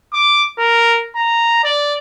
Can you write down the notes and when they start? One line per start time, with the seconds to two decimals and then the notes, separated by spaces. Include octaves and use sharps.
0.13 D6
0.58 A#4
1.16 A#5
1.63 D5